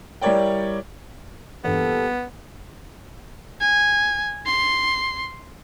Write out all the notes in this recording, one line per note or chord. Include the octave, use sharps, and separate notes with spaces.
G3 E4 A#4 C#5 D5 G5
E2 G2 A#2 B3 G4 A4
G#5
C6